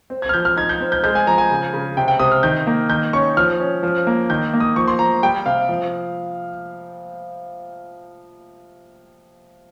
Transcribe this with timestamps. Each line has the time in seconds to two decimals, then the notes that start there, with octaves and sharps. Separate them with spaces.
0.10 C4
0.22 G#6
0.29 F6
0.34 F3 G6
0.45 F6
0.56 D#4 G#6
0.69 G6
0.81 C4
0.92 G6
1.03 G#3 G6
1.15 G#5
1.27 F3 A#5
1.38 G#5
1.51 C#3
1.74 C#3
1.97 C3 G5
2.08 G5
2.19 C3 D#6
2.32 F6
2.43 D#3 G6
2.67 A#3
2.89 D#3 G6
3.13 C#4 C#6
3.37 F3 F6
3.60 C#4
3.83 F3
4.07 A#3
4.30 D#3 G6
4.54 A#3
4.60 D#6
4.76 F3 C#6
4.88 C6
4.99 F3 A#5
5.23 G3 G5
5.46 C3 F5
5.69 F3